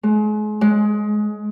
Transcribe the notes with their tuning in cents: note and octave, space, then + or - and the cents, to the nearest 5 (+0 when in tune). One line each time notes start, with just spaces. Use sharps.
G#3 +35
G#3 +15